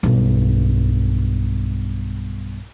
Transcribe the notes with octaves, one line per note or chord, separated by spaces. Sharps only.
B1 G2